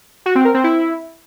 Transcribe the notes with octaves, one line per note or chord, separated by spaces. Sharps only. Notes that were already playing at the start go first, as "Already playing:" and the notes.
F#4
C4
A#4
C4
E4